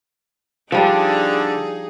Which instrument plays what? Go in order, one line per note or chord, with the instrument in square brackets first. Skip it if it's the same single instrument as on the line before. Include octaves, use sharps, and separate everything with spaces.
[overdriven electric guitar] D3 [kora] F3 G3 D4 [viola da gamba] D#4 G#4